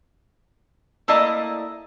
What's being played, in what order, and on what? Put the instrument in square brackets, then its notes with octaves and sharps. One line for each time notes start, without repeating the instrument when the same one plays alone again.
[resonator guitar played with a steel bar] A3 A#3 E4 D5 D#5